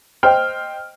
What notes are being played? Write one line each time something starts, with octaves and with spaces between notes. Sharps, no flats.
C5 D#5 G5 F6